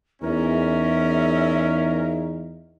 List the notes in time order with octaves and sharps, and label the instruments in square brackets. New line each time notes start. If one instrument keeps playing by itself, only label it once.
[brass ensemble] E2 [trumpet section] C#4 A#4 [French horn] D#4 [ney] E5